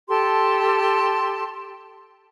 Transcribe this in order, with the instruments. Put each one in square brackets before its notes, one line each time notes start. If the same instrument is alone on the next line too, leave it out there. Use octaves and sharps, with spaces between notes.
[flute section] G4 A4 A5 C6